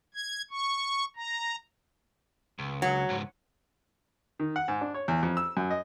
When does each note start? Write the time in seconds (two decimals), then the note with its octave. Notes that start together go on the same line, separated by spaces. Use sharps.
0.14 G#6
0.51 C#6
1.16 A#5
2.59 C#2
2.82 F#3
3.09 C#2 G#2
4.40 D#3
4.56 F#5
4.68 G#2
4.81 D4
4.94 C#5
5.08 E2
5.23 F2
5.37 E6
5.57 F#2
5.70 D#5